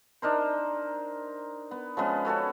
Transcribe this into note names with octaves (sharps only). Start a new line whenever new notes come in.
D4 D#4 A#4 C5
B3
F3 G#3 B3 C#4
C#4 F#4 A4 C#5